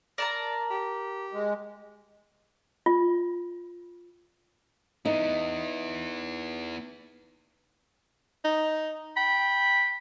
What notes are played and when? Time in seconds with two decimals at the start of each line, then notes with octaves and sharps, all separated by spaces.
0.18 A#4 D5 A5 A#5
0.71 G4
1.33 G#3
2.86 F4
5.06 B3 D#4 E4
8.45 D#4
9.17 G5 B5